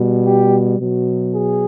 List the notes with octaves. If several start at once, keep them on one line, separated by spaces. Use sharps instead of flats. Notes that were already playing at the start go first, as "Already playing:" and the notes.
Already playing: B2 G3
G4
B2 F#3
G#4